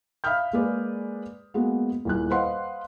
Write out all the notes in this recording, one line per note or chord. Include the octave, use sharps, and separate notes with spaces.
E5 F5 B5 D#6 F6 G6
G#3 A#3 G#4 B4 D5
G#3 A#3 B3 F#4
D#1 E2 F#6
B4 C5 D#5 F5 F#5 C6